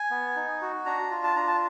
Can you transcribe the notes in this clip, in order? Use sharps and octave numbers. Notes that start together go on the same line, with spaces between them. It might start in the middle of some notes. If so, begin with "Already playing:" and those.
Already playing: G#5
B3
D#4
F#4
D4 A#5
F4
A5
D4 A#5
A5